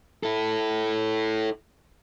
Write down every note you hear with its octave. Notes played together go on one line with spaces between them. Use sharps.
E4 A4